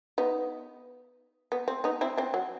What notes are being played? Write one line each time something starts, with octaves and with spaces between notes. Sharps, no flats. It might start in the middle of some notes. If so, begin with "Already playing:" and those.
B3 D#4
B3
C4
B3 D#4
C4 E4
C4 E4
F#3